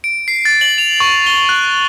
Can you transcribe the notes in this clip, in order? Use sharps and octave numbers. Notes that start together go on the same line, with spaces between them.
D7
C7
A6
F#7
F7
C#6
G7
F#6